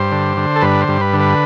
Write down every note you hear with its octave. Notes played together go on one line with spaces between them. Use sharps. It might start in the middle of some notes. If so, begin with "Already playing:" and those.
Already playing: G2 C5
D3
D3
A4
G2 B4
C5
G2
B4
D3
B4